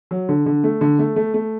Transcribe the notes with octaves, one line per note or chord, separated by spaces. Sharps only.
F#3
D3
D3
A3
D3
A3
A3
A3